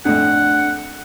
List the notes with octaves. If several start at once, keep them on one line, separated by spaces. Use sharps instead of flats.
F2 A2 D4 F#5